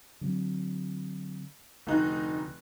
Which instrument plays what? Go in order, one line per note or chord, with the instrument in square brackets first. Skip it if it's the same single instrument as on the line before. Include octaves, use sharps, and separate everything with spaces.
[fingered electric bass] D3 F#3 C4
[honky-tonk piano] F1 D#4 F#6 [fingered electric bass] D2